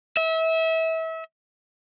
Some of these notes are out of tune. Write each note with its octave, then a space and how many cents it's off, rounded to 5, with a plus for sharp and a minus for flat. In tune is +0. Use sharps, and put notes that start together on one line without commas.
E5 -30